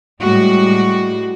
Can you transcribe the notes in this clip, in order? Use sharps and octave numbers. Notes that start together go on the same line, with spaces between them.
A2 G3 G#3 F#4